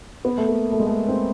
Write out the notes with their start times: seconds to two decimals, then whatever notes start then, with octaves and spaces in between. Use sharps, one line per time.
0.25 B3
0.38 A3
0.49 A#3
0.72 A3
0.79 G#3
0.87 A3
1.08 C4